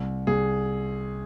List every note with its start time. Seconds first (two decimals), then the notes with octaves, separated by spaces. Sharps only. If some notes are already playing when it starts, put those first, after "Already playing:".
Already playing: C2
0.27 C2 G#4